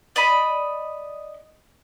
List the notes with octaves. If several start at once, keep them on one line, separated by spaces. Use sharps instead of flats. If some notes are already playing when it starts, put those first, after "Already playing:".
D5 D#5 B5